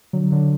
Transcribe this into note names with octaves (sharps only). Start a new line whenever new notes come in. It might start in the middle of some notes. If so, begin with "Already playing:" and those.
D3 F#3
D3 F#3